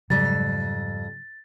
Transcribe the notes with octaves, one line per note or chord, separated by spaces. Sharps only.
F2 G#2 C#3 F#3 G3 A6